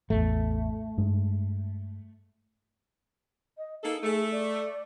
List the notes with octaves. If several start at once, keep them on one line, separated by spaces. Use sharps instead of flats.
A1 E2 A3
G2 G#3
D#5
A#3 D#4 G#4 A4
A3 G#4
D5